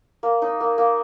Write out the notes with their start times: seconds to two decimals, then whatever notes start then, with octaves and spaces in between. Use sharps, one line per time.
0.23 A#3
0.42 D#4
0.60 A#3
0.78 A#3